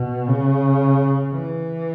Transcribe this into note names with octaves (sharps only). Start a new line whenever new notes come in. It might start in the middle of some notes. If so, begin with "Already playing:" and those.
Already playing: B2
C#3
E3